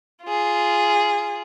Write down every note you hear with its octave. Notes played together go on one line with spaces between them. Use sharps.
F4 G#4